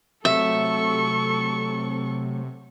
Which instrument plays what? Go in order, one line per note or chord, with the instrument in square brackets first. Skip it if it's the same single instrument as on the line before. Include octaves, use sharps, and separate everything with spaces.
[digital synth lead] C3 [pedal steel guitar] F#3 A3 [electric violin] A4 C#6 [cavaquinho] E5